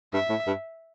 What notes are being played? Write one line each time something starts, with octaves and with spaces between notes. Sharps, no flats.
G2 E5
A2
G2